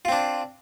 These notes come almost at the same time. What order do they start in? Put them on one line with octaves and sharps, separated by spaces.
F4 C4 D4